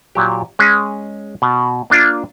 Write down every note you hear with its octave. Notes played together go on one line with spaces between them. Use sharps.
A#2 F#3 G4
G#3 C#4 G#4
B2
A#3 D4 F4